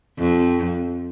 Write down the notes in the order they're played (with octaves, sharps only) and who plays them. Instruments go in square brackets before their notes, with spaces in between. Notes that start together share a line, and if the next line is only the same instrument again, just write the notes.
[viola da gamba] F2